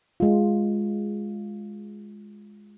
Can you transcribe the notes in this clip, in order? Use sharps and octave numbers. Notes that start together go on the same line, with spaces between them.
G#3 F4